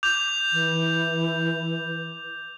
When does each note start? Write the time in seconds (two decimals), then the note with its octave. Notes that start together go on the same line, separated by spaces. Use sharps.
0.03 D6 G6 F7
0.52 E3